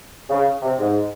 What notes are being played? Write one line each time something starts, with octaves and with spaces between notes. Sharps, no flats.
C#3
C3
G#2